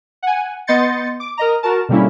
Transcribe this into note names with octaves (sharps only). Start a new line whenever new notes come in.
F#5 G#5
B3 D#5 C6 G6 A6 C#7
D6
A#4 D#5 A#5
F#4 A#4 A5
B2 D3 G3 A#3 C#4 E4